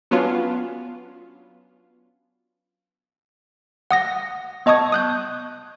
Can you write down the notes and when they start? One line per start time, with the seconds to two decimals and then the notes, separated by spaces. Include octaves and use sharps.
0.11 F#3 B3 C#4 D4 F4
3.91 F#5 D#6 A#6
4.66 B3 D#5 A5 C#6 D#6 G#6
4.92 D#6 F#6 G6